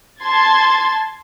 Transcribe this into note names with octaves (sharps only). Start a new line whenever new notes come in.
A5 C6 G#6 A6